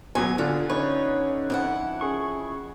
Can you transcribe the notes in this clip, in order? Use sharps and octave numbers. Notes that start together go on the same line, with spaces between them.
D#2 B2 F#3 G#5
D3 D4 F4
C#4 D#4 B4 C#5
F2 E4 F#5
C#4 G#4 C#6